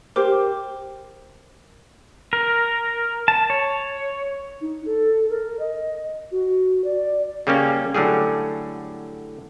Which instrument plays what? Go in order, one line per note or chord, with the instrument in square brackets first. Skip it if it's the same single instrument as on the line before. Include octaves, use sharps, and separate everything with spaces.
[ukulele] G4 C5 [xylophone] A#4 D6
[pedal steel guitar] A#4
A5
C#5
[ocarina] D#4
A4
A#4
D#5
F#4
D5
[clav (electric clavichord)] C#3 G3 A#3 C#4
A2 D3 F#3 G3 G#4